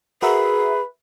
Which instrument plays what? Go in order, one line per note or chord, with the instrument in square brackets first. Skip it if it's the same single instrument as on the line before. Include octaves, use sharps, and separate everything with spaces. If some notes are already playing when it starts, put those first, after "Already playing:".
[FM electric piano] F#4 A#4 E5 [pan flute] G#4 [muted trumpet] B4